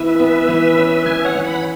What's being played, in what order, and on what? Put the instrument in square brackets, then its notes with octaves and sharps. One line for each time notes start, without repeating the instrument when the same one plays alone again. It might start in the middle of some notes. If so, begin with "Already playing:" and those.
Already playing: [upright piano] E3 B3 E4 [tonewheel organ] B4 E5
[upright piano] B3
E3
C#4
[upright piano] E3 [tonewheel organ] E5 G#5
[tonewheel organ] C#5 F#5
[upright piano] E3
[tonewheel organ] F#5 B5